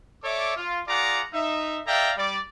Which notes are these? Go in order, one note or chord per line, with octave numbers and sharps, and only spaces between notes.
A4 C#5 D5 E5 D6
F4
F4 G#4 D5 F#5 A#5 D6
D#4 E5
A4 D5 E5 F5 G5 A#5
G3 D5